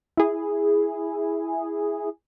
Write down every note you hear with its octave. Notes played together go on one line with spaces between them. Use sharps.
E4 G#4